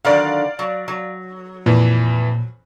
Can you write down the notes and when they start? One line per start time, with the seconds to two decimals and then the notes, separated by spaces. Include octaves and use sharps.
0.05 D3 D#3 F#3 D5 F5
0.59 F#3
0.88 F#3
1.66 F2 A#2 E3